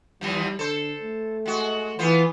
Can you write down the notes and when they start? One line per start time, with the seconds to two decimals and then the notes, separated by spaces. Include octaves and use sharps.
0.21 D#2 E3 F3 G3
0.59 D3 A4 C5
1.02 A3
1.46 G#3 F#4
1.99 E3 B3 F4 C5